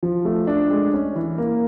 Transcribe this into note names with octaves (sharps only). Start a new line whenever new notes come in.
F3
A3
D4
G#3
C#4
E3
A#3